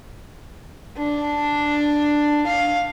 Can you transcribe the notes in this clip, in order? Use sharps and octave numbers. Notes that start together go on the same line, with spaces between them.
D4
F5